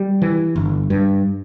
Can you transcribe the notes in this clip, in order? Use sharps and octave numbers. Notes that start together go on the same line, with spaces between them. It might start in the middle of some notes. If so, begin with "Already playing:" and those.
Already playing: G3
E3
G1
G2